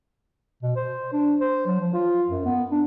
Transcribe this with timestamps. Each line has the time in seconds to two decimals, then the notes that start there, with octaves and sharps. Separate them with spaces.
0.62 B2
0.76 C5
1.13 D4
1.41 C5
1.66 F#3
1.80 F3
1.94 F4
2.29 F#2
2.45 B3
2.71 D4